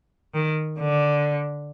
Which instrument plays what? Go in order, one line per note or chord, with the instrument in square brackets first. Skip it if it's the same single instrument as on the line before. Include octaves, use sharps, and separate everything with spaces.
[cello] D#3
D3